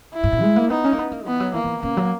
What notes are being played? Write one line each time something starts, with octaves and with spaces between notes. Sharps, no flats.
E4
G#2
A#2
G#3
A#3
B3 D#4
C#4
A#3
B3
A#3
E3 B3
F#3
E3 A#3
E3
C#3 A#3
F#3